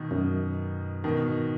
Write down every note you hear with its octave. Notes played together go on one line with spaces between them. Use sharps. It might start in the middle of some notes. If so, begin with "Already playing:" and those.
Already playing: B2 D#3
F#2
G#2 B2 D#3